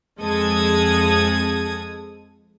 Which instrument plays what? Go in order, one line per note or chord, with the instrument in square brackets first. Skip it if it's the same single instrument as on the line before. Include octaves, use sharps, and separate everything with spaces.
[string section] F2 G#3 A4 D#6 G#6